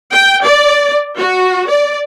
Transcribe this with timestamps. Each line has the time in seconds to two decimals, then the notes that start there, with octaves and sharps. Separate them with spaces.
0.12 G5
0.44 D5
1.18 F#4
1.69 D5